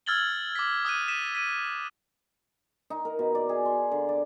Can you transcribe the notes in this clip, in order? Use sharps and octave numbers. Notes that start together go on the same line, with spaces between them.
E6 F6 G#6 A6 F#7 G7
D6 B6
D#6 F6 F#6 D#7
B6 D#7 E7
B6 D#7
D#4
A#4
B2
D5
G#4
C6
D3
D5